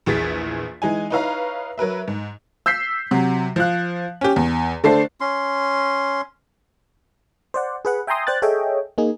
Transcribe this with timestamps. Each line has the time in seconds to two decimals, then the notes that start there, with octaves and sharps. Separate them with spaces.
0.06 A#1 E2 G#4 A6 B6
0.82 E3 G#3 D#4 G#5
1.10 D#4 E4 B4 C#5 F5 A#5
1.78 F#3 A#4 B4 E5
2.08 G#2
2.66 E6 G6 B6 C7
3.11 C3 F#3
3.56 F3 F5 F#6
4.21 C#4 G4
4.36 E2
4.84 D3 A3 D4 A4 C5 C7
5.21 C#4 C6
7.54 C5 D5 F#5
7.85 G#4 B4 F#5
8.07 E5 G5 G#5 A#5 C6 D#6
8.27 C5 D5 G5 F#6 A6
8.42 G#4 A4 C#5 D#5 E5 G5
8.98 A#3 D#4 G#4